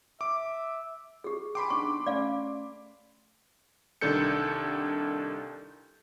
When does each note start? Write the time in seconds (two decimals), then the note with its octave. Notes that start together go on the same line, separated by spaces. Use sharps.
0.21 E5 D6
1.24 G4 G#4
1.55 G5 G#5 B5 C6 D6
1.70 B3 D4 D#4 C#6
2.06 A3 C#4 D5 F5
4.01 C2 D#3 D4 A4 G6 C#7